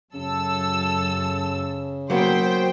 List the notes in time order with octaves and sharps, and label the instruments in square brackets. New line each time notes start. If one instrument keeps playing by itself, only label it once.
[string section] F#2 A4 E6 [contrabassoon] C#3
[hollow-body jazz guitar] F#3 A#3 B3 [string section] C5 G5